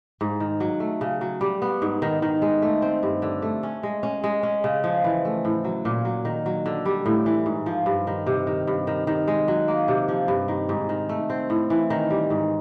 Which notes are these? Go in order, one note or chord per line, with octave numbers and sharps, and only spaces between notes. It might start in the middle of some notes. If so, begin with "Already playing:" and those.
G#2
D#3
F#3
A3
C#3
F#3
G3
B3
G#2
D#3
D#3
G#3
A3
C4
G2
D3
A3
C#4
G#3
C#4
G#3
C#4
C#3
F3
E3
A3
A2
F#3
A#2
F#3
D#3
F#3
D3
G3
A2
E3
G#2
F3
G2
D#3
C3
D#3
G2
D#3
D#3
G#3
F#3
A#3
C3
F3
G2
D#3
G#2
D#3
A3
C4
A2
E3
D#3
G3
G#2